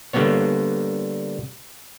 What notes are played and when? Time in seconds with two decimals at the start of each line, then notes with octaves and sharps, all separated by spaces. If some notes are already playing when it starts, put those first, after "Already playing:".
0.13 D3 G3 A#3 B3 C#5